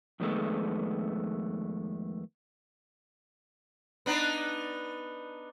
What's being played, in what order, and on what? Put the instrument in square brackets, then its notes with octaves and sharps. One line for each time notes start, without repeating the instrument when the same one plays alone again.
[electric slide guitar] F2 D#3 G#3 A3 B3
[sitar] B3 D4 D#4